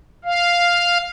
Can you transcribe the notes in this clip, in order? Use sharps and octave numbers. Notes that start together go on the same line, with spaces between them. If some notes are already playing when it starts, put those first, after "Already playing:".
F5